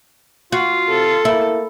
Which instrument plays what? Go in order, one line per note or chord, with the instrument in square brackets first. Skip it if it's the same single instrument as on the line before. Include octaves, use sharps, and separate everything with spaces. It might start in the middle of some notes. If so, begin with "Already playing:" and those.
[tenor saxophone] F4 [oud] F#4
[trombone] C3 [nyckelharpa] A4
[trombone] A#3 [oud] E4